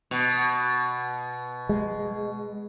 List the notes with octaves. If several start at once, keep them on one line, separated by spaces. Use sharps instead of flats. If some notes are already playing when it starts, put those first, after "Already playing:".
B2
G#3